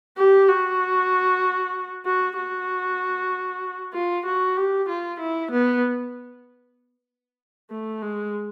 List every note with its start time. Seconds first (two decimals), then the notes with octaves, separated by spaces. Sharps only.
0.17 G4
0.49 F#4
2.06 F#4
2.37 F#4
3.94 F4
4.26 F#4
4.57 G4
4.89 F4
5.20 E4
5.52 B3
7.70 A3
8.02 G#3